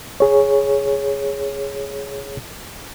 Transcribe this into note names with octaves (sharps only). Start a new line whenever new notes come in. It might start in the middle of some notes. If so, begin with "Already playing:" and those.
G#4 C#5